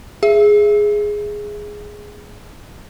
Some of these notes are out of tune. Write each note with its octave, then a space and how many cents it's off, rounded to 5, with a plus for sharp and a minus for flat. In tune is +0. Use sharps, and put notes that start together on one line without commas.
G#4 +0 E5 +20